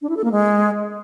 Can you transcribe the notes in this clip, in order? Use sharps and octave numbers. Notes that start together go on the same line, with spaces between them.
D4
E4
A4
A#3
G#3